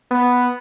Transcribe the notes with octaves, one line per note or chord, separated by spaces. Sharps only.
B3